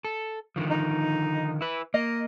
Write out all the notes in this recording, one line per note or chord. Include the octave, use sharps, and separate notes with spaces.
A4
D3 D#3 F3
D#4
E4 B4
A#3 D#5